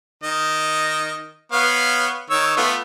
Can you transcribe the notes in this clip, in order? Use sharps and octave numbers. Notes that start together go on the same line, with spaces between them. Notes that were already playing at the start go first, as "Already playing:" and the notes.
D#3 D#5
B3 C#5 F5
D#3 C#5 E6
A3 B3 F4